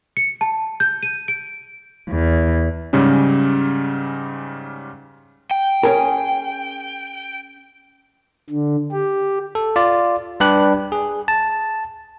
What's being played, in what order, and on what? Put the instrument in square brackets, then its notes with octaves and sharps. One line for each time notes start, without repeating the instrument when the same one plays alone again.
[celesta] C#7
A5
G6
D#7
D7
[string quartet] E2
[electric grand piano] G#2 C#3 G3 C#4
[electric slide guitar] G5
[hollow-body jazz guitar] C#4 G#4 A#4
[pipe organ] D3
G4
[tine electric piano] A4
F4 D5
G3 D4 G4 B4 F#6
G#4
A5